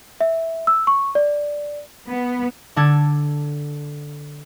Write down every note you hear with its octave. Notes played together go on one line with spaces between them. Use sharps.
E5
E6
C#6
D5
B3
D3 D4 A4 G#6